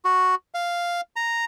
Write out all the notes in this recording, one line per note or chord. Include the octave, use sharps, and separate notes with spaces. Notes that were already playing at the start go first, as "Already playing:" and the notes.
F#4
F5
A#5